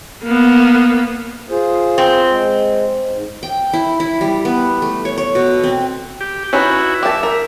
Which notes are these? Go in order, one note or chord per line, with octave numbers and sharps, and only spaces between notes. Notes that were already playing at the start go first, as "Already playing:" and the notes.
A#3 B3
F4 G#4 C5
C4
G#3
G#2
G5
E4
E4
G3
B3
A3
C#5
C#5
B2
C4
G4
C#4 D#4 E4 F#4 B4
G4 E5 A5
A#4